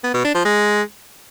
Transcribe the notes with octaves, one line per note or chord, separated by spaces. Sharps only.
B3
B2
D4
F3
G#3